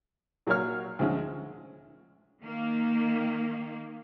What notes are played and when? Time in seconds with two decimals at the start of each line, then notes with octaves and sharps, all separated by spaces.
0.47 A#2 F#3 A#3 F#4 C#5 F6
0.99 D2 F3 G#3 C#4
2.41 D#3 A#3